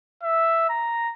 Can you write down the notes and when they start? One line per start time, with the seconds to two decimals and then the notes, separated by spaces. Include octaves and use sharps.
0.23 E5
0.70 A#5